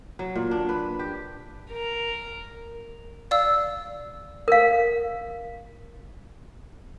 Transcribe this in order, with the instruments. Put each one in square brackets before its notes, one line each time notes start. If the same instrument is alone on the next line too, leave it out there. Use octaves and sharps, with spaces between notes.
[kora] F#3
A#2
D4
B4
G4
[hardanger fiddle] A#4
[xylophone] D5 F5 E6
[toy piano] A#4 F5